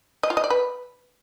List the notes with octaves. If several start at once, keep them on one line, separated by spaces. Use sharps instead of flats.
D#5
F4
D#5
D5
B4